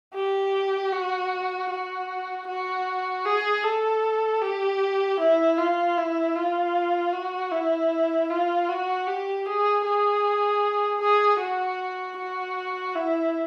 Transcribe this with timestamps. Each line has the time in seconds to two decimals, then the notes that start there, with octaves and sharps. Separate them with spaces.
0.14 G4
0.92 F#4
1.70 F#4
2.47 F#4
3.25 G#4
3.63 A4
4.42 G4
5.20 E4
5.58 F4
5.97 E4
6.36 F4
7.13 F#4
7.51 E4
8.30 F4
8.69 F#4
9.07 G4
9.46 G#4
9.85 G#4
11.01 G#4
11.40 F#4
12.17 F#4
12.95 E4